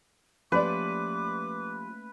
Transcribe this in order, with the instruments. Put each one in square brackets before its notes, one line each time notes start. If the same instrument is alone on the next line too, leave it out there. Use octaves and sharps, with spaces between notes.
[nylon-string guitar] F3 G4 D5 [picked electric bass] A3 A#3 C#4 [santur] B4 [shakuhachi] D6